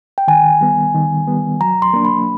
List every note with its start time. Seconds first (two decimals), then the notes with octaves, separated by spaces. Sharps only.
0.18 G5
0.28 D#3 G#5
0.61 G3 B3
0.94 D#3
1.27 G3 B3
1.61 F#3 A#5
1.82 C6
1.94 A#3 D4
2.05 B5